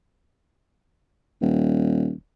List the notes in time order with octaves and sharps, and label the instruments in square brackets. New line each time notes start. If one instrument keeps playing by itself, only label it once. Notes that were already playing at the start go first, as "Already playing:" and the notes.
[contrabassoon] D#1